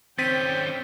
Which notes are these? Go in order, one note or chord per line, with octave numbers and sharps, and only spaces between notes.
D#3 C4 C#4 G5 A6 B6 D#7